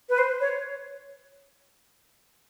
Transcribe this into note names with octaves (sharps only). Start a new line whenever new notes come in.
B4
C5
C#5